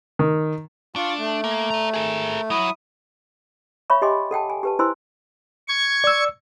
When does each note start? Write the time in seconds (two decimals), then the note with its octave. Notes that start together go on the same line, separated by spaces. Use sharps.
0.19 D#3
0.96 D4 F4 C#6
1.18 A3
1.44 A#3
1.70 D5 A#5
1.94 G#4 A#4
2.50 F#3 E4 D#6
3.90 C#5 E5 F5 B5 C#6
4.02 G4 D#5 G5 G#5 C6 D6
4.31 A4 F#5 G5 A5
4.50 G#5
4.63 G4 B4 A5
4.79 E4 B4 C5 G#5 C6 E6
5.68 C#6 G#6
6.04 D5 E6